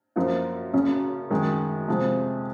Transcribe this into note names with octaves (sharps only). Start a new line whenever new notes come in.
F#2 F3 A#3 F4
F#1 F#2 C#3 F#3 C#4
F#2 D#3 G#3
F2 C3 F3 G#3